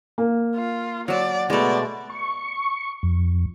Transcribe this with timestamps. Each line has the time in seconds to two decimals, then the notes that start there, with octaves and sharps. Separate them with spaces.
0.18 A#3
0.56 F4
1.08 F#3 D5 A5
1.50 B2 G#3 A3 D5
2.10 C#6
3.03 F2